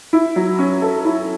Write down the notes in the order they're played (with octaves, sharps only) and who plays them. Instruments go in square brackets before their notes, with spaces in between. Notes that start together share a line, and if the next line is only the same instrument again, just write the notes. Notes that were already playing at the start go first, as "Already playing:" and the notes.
[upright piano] E4
F#3
C#4
A4
E4